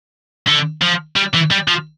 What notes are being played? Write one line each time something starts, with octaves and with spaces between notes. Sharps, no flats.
D3
F3
G3
E3
G3
F3